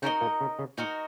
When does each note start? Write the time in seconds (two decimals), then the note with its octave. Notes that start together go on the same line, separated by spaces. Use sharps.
0.02 C#3 C#4 D#4 F#4 A#4 D#5
0.21 A#2 A#3
0.41 C#3
0.59 C#3
0.78 A#2 D#4 F#4 A#4 D#5